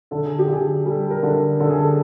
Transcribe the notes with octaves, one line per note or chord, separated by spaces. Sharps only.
D3 A4
G#4
G4
D3 G#4
G3 A4
A#4
D3
D3 A4
G#4
A4